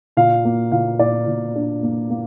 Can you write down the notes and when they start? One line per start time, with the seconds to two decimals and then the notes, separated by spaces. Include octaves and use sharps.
0.17 A#2 F5
0.45 A#3
0.72 A#2 F5
0.99 A#2 D5
1.27 A#2
1.56 D4
1.83 A#3
2.10 A#3